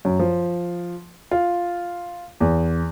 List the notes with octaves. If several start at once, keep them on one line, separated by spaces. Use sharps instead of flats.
F#2
F3
F4
E2